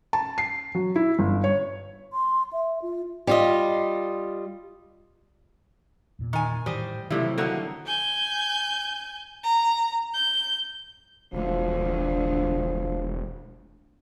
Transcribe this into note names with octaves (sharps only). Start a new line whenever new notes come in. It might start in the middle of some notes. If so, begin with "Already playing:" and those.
A5
C7
F#3
E4
G1
C#5
C6
E5
F4
G3 F4 D#5
E2 A#2
D#3 G#5
A2 D#3 E3 G3 C5 D#5
A2 C3 D#3 E3 F#3 G3 E4 F4
D3 A3 A#3 D#4 F#4
G#5 G6
A#5
G6
E1 D2 F3